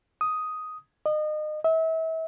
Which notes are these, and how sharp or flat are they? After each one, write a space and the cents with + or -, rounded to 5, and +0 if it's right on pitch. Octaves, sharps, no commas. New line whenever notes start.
D#6 +5
D#5 -30
E5 -35